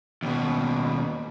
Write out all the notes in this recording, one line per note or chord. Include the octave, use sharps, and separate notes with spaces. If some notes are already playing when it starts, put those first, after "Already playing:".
D#2 B2